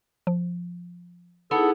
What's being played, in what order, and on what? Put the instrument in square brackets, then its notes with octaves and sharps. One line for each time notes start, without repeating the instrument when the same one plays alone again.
[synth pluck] F3
[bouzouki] B3 [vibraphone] D#4 E4 G#4 [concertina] A4